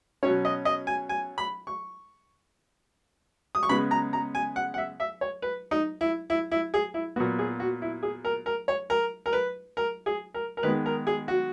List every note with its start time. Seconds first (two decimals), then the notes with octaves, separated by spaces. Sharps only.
0.23 B2 F#3 C#4 C#5
0.45 D#5
0.65 D#5
0.87 G#5
1.09 G#5
1.38 B5
1.67 C#6
3.55 D#6
3.63 C#6
3.69 C#3 G#3 B3 B5
3.91 A#5
4.13 A#5
4.35 G#5
4.56 F#5
4.74 F#5
4.78 E5
5.00 E5
5.21 C#5
5.42 B4
5.71 D#4
6.01 E4
6.30 E4
6.51 E4
6.74 G#4
6.94 E4
7.16 A#2 F#3 B3 F#4
7.39 G#4
7.60 F#4
7.82 E4
8.03 G#4
8.25 A#4
8.46 A#4
8.68 C#5
8.90 A#4
9.26 A#4
9.33 B4
9.77 A#4
10.06 G#4
10.34 A#4
10.57 A#4
10.63 D#3 G#3 B3 B4
10.86 A#4
11.07 G#4
11.28 F#4